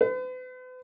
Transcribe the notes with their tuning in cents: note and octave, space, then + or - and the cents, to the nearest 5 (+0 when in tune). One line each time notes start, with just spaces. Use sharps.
B4 +45